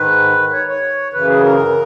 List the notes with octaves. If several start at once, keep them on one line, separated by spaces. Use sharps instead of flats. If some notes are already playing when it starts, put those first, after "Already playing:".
Already playing: G#2 D#3 B4
C#5
C#5
F#2 C#3 E3 B4
G#4
A#4